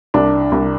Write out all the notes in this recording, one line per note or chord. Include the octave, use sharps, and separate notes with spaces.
C2 D4
C2